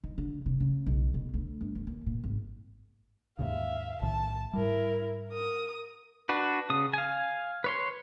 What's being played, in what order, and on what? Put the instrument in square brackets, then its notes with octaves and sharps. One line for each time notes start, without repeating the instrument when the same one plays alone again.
[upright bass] D#3
D3
C3
C#3
B1
B2
D2
G1
E2
D#2
A#2
G#1
[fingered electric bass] D#2 G#2 C#3 [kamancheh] E5 F5
[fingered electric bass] B1 A2 D#3 [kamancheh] A5
[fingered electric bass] G#2 G3 [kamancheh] E4 A#4
[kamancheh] A#4 D#6
[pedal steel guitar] D4 F#4 B4
C#3 D#6
F5 G#5
B4 C#5 C6